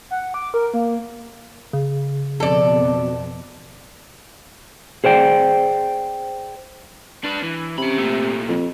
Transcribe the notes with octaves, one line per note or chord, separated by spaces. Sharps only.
F#5
D6
A#4
A#3
C#3
F2 B2 A4 D5
G#4 C5 D5 G5
D4 B4
E3
C3 C#4 B5
A#2 A3
F2